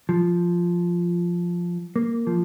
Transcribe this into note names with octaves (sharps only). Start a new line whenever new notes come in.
F3
A#3
F3